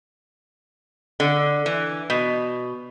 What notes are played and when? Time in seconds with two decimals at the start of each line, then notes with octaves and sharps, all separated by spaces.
1.20 D3
1.66 E3
2.10 B2